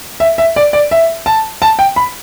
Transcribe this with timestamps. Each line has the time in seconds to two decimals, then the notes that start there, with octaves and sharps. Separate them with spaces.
0.20 E5
0.38 E5
0.56 D5
0.73 D5
0.91 E5
1.26 A5
1.62 A5
1.79 G5
1.96 B5